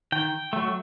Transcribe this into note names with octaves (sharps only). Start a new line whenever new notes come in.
D#3 G5
F#3 A3